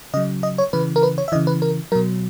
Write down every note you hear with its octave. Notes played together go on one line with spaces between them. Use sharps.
C#3 F#3 D#5
D#5
C#5
C#3 E3 B4
A#4
B4
C#5
E5
C#3 E3 D#5
B4
A#4
B2 F#3 A#4